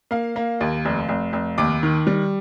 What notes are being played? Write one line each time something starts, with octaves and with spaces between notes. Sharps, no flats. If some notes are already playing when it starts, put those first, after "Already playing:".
A#3 F5
A#3
D#2
F1
F1
F1
D#2 D6
D#3
G3